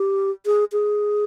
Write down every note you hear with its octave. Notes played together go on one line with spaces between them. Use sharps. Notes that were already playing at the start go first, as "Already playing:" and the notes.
Already playing: G4
G#4
G#4